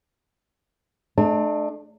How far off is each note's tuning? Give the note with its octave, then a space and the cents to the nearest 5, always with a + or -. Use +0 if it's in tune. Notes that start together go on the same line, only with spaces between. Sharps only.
A3 -30 D4 +35